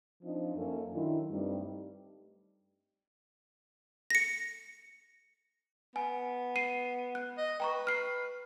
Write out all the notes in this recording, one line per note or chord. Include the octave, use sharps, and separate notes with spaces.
F3 C4 D4 D#4 F4
F#2 A#3 C#4 A4
D#3 F#3 D4 E4 F4
G2 G3 A3 C4 D#4
A#6 C#7
B3 G#5
C7 D#7
F#6
D#5
B4 G5 A#5 C#6
F6 C7